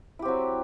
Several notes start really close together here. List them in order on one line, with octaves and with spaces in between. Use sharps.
E4 G4 C4 F#3